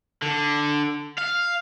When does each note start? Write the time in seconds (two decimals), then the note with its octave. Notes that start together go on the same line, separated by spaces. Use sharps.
0.22 D3
1.18 F5